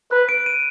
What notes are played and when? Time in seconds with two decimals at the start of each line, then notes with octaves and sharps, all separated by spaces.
0.11 B4 F#6
0.29 D7
0.46 D#7